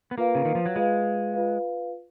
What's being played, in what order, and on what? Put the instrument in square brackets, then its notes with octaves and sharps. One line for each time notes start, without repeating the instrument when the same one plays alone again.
[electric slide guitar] B3
[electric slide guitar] A#3 [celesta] F4 B4 F5
[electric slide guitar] C#3
D#3
F3
F#3
[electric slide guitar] G#3 [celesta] F4 B4 F5
[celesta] F4 B4 F5